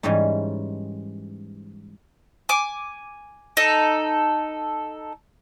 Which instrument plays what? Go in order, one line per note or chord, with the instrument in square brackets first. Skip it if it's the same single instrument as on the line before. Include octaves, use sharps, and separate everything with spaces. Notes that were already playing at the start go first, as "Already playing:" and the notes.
[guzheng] G#2 E3 G3 C#4 D#4
[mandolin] G#5 D6
D#4 A4